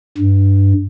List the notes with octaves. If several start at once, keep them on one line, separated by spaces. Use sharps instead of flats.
G2